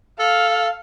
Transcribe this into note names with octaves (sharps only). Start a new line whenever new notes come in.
A4 F5